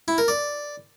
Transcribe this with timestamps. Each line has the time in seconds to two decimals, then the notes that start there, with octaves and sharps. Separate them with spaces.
0.08 E4
0.18 A#4
0.28 D5